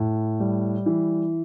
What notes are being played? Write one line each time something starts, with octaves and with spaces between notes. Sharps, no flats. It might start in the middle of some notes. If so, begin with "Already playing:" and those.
Already playing: A2
G3
E3